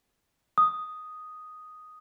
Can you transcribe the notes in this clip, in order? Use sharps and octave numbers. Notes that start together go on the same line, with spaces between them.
D#6